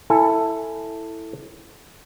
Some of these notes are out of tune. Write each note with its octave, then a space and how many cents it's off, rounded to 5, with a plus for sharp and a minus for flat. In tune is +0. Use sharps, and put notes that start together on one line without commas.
E4 +0 A4 +10 G#5 +0